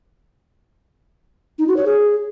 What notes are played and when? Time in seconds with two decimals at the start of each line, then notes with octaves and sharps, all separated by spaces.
1.59 D#4
1.68 F#4
1.77 C#5
1.85 G#4